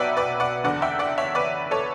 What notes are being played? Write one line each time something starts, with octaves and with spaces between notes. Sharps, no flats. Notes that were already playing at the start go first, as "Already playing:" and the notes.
Already playing: B1 B2 F#3 B4 D5 E5 F#5 G5
B4 D5
D5 F#5
F#1 E2 D3 D5 F#5
E5 G5
D5 F#5
C#5 E5
B4 D5
A4 C#5